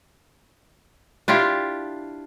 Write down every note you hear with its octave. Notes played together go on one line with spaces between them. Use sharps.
D4 E4 F4 G4